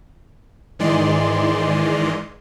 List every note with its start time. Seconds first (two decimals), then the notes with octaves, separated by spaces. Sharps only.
0.79 G#2 D#3 E3 G#3 D5 C6